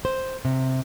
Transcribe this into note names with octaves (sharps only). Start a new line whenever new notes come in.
C5
C3